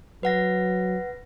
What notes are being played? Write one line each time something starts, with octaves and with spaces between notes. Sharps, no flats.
F#3 B4 F#5 A#6